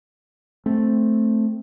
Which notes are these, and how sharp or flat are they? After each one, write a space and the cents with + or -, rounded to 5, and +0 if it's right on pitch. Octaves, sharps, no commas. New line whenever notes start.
A3 +0 C4 +0